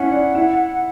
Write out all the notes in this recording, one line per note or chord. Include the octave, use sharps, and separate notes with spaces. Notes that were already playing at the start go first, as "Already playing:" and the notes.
Already playing: C#4 E4 F#5
D4
E4